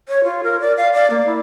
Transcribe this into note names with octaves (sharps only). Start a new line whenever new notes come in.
C#5
F4
A#4
D5
F5
D5
A#3
E4